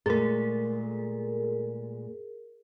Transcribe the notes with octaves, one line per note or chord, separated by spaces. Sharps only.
A#2 G#3 A3 G#4 A#4